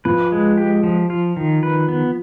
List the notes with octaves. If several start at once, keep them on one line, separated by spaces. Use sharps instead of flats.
F3 B4
G#3
G4
F3
F4
D#3
B4
B3